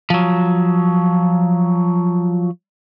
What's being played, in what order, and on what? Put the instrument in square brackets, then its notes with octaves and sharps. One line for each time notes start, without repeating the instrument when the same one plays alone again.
[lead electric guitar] F3 F#3